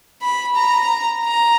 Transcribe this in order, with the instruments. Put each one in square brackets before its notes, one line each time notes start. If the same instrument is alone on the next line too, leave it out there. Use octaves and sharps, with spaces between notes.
[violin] B5
A#5
A#5